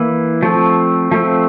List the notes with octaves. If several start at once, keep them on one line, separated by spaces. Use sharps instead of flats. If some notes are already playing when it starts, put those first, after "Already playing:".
Already playing: E3 A#3 E4
F3 A3 C4
F3 A3 C4